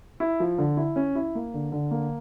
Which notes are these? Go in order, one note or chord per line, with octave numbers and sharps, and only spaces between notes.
E4
F3
D3
E4
C#4
E4
A#3
D3
D3
A#3